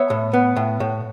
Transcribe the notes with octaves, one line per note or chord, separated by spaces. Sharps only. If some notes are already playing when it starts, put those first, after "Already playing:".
Already playing: B3 C#5 E5
A2
B3
A2
A2